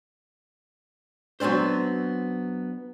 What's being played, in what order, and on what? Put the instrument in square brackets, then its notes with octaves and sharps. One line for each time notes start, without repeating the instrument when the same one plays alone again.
[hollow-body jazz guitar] F#3 B3 C4 D4 C5